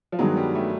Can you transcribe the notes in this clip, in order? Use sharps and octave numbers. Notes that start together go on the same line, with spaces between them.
F3
G2 D#3 F#3 G#3 B3
G3
A3